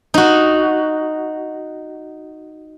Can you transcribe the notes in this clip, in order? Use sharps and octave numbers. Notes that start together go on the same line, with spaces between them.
D#4 F#4